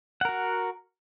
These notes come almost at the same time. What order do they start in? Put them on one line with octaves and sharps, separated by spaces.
F#5 A#4 F#4